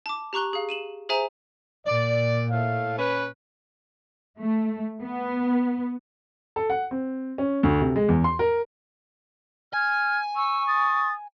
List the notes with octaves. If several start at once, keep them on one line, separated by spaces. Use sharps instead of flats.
A5 D6
G4 A#5 C#6 F#6 G7
G#4 F5
D#7 E7 F#7
G#4 C5 E5 G#5 A#5
A#2 D5
A2 A3 F5
C#4 B4
A3
B3
A4
F#5
C4
C#4
D2
C3
G#3
E2
C6
A#4
G#5 F6 G#6
C#6 E6
D#6 A6